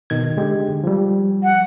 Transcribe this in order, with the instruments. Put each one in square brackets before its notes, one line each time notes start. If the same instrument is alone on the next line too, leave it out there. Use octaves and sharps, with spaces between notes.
[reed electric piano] B2 D#3 G#6
D3 G#3 G4
F3 G3
[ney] F#5